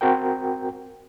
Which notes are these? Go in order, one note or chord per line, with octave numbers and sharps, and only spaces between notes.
C4 F#4 A#4 G5